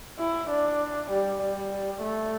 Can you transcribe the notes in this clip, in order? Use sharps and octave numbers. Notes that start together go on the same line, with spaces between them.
E4
D4
G3
G3
A3